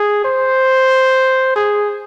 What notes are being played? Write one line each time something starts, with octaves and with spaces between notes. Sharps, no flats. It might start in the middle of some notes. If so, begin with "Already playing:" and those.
Already playing: G#4
C5
G#4